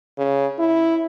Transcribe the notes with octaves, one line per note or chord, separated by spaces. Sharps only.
C#3
E4